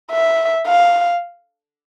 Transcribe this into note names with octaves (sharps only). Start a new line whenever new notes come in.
E5
F5